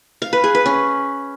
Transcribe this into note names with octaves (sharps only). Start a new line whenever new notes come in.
F5
B4
G#4
B4
C#4